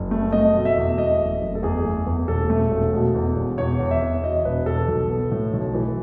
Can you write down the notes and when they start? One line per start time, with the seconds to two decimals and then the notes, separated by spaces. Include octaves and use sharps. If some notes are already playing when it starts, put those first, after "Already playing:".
Already playing: F#1
0.11 A3
0.32 A3 D#5
0.54 B2
0.65 E5
0.77 E2
0.98 A3 D#5
1.20 F#1
1.41 F#1
1.55 A4
1.63 E2 G#4
1.85 A3
2.06 E2
2.28 E1 A4
2.50 A3
2.71 E1
2.93 B2
3.15 E2
3.36 E1
3.58 E2 C#5
3.80 E2
3.91 E5
4.01 E2
4.23 B2 D#5
4.44 E1 B4
4.66 E2 A4
4.88 B1
5.10 B3
5.31 A2
5.53 B1
5.74 E3